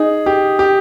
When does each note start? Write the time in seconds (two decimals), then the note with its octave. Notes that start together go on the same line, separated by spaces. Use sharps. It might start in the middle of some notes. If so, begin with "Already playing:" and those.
Already playing: D#4 G#4
0.26 G4
0.59 G4